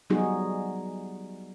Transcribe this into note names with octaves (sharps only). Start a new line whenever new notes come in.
F#3 G3 B3 D#4 F#4 G#4